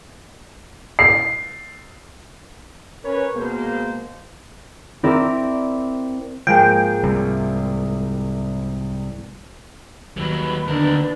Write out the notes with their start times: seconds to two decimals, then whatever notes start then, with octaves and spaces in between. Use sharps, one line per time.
0.99 C7
3.04 C#4 A#4 B4 C#5
3.35 B2 G#3 A#3 C5
5.03 C4 E4 A#4 D5
6.47 G#2 F3 G#3 A#3 G#4 G5
7.03 C2
10.17 D#2 F#3 G3 B4
10.68 D2 D4 A#4